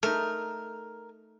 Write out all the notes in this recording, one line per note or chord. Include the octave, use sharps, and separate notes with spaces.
A3 D#4 A#4